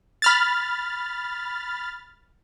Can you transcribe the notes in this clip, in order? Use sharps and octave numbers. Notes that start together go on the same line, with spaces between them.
B5 F6 A6